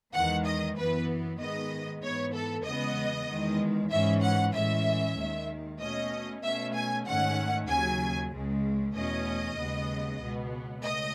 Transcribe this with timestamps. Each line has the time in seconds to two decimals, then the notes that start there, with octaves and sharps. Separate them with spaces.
0.13 E2 D#3 G#3 F#5
0.45 D#5
0.76 F#2 E3 B3 B4
1.39 G#2 D#3 G#3 B3 D#5
2.02 G#2 E3 B3 C#5
2.34 A4
2.65 E2 C#3 G#3 B3 D#5
3.28 E2 D#3 G#3
3.91 G#2 E3 G#3 C#4 E5
4.22 F#5
4.54 A2 E3 G#3 C#4 E5
5.17 D#2 D#3 G#3
5.79 B2 A3 C#4 D#5
6.43 B2 A3 C#4 E5
6.74 G#5
7.06 G#2 D#3 A3 C#4 F#5
7.69 D#2 C#3 F#3 G#5
8.32 C#2 C#3 G#3
8.95 E2 B2 A3 C#4 D#5
9.57 D#2 C#3 G#3 B3
10.20 C#2 B2 G#3 B3
10.84 C#2 A3 D#5